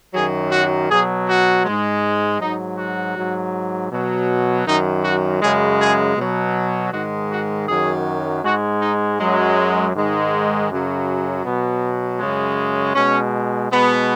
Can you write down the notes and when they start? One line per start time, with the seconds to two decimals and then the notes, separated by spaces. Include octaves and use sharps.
0.14 F#2 D#3 F#3 G#4
0.51 F#4
0.89 B2 F#3 G#4
1.27 F#4
1.65 G#2 G#3
2.40 G#2 F#3 D#4
2.78 F#4
3.16 G#2 F#3
3.91 B2 F#3
4.66 F#2 D#3 F#3 D#4
5.04 F#4
5.41 F#2 C#3 G#3 G#4
5.79 G#4
6.17 B2 F#3
6.92 G#2 D#3 G#3 F#4
7.30 F#4
7.67 F#2 D#3 F#3 G#4
8.43 G#2 G#3 F#4
8.81 D#4
9.19 F#2 F#3 G#3
9.94 G#2 D#3 G#3
10.69 F#2 C#3 F#3
11.44 B2 F#3 B3
12.19 F#2 C#3 G#3
12.94 B2 G#3 C#4
13.70 B2 G#3 B3